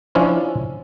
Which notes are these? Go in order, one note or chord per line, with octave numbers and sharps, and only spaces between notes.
F3 C#4 D4 E4 F4